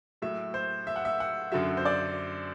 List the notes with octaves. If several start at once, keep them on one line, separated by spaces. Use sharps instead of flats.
A2 F#3 E5
C5
E5
F#5
E5
F#5
F#2 D3 F#3 E5
C5
D5